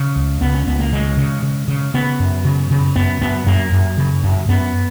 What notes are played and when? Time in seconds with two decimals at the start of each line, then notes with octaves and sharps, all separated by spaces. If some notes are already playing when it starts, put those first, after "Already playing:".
Already playing: C#3
0.16 C#2
0.41 C#2 B3
0.54 C#4
0.67 C#2 B3
0.79 A#3
0.92 C#3 G#3
1.17 C#3
1.43 C#3
1.68 C#3
1.94 C#3 B3
2.20 F#2
2.45 C#3
2.71 C#3
2.96 F#2 B3
3.21 F#2 B3
3.46 F#2 A#3
3.72 F#2
3.98 C#3
4.24 F#2
4.48 F#2 B3